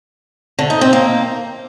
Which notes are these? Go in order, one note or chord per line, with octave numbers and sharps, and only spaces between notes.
D3
D#4
C4
A#3